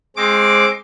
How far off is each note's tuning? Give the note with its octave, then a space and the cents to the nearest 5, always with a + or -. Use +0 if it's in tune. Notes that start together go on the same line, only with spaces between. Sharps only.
G#3 +5 C4 +20 D6 +0